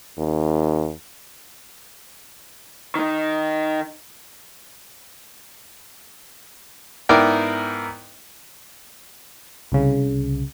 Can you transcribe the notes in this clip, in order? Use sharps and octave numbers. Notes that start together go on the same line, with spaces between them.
D#2
D#3 D#4
G#2 B3 E4 A#4 D5 G5
C2 C#3